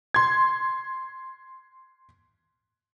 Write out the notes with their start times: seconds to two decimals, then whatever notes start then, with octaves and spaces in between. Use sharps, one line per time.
0.14 C6 G#6